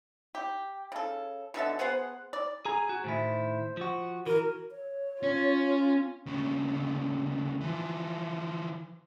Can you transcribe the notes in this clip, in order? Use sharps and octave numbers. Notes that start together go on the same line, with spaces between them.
G4
C#3 A4
B2 D3 E5 A5
B3 G#4 C5 F#5
D5
G#4 G#5 A#5
F#4
A2 D#3 E4 C5
F3 F#4
E3 F#4 A#4
C#5
C#4 F4
D#2 C#3
E3 F3